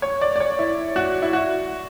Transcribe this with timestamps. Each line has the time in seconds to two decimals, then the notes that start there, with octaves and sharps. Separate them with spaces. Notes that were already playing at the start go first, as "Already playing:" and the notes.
0.02 C#5
0.21 D5
0.36 D5
0.40 C#5
0.59 E4
0.96 F#4
1.22 E4
1.33 F#4